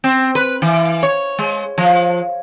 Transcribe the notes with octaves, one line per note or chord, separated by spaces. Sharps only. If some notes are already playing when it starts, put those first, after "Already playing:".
C4
B4
E3
C#5
G#3
F3